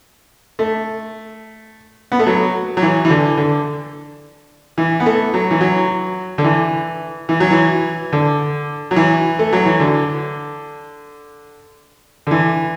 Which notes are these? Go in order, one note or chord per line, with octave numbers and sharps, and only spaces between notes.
A3
B3
A3
F#3
F#3
E3
E3
D3
D3
E3
B3
A3
F#3
E3
F#3
D3
E3
E3
F#3
E3
D3
F#3
E3
A3
F#3
E3
D3
D3
E3